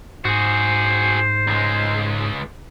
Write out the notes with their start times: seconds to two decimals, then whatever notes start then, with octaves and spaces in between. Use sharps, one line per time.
0.25 G#2 F#4 G#4 C5
1.47 C#2 G#3